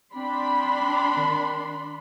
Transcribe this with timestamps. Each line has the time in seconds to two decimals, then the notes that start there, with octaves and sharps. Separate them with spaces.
0.16 C4 D4 B5 C6
1.17 D#3